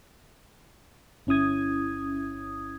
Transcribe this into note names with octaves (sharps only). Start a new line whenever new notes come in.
G1 C#4 E4 D#6 G#6